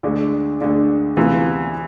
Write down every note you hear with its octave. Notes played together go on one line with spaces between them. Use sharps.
D2 D3 G#3 D4
D2 D3 G#3 D4
D2 C3 E3 B3 F4